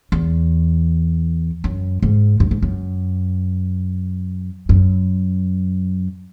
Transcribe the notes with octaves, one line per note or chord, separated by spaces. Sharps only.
E2
F#2
G#2
F#2
G#2
F#2
F#2